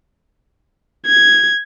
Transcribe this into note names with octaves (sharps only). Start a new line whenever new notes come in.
G#6